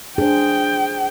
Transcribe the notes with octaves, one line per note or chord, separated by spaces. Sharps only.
D4 G#4 C5 G5